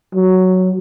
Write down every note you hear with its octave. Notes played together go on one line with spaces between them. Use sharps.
F#3